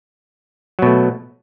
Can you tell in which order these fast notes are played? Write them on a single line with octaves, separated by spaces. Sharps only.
F#3 B2 A3